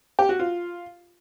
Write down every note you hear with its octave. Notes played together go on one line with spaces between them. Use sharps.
G4
F#4
F4